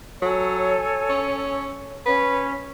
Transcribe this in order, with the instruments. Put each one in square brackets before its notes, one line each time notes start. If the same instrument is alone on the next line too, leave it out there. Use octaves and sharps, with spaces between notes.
[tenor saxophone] F#3 [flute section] A4 C#5 G#5
[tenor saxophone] C#4
[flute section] C#4 C#5 [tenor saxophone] B4